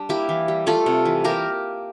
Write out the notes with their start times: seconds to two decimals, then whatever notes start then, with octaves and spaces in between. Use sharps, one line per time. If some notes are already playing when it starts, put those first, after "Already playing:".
Already playing: G3 D4
0.09 A#3 E4 G4
0.29 E3
0.48 G3
0.66 A3 F4 A4
0.86 C3
1.05 E3
1.24 A#3 G4 A#4